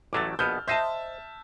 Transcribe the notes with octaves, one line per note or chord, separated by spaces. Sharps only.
A1 F#3 A3 D6 E6 A6
A#1 B2 B3 F6 G6
C5 D#5 E5 A5